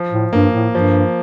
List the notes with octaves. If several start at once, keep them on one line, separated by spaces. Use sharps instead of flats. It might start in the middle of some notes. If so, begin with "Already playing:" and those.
Already playing: F3
A2
G2 A#3
A2
G2 F3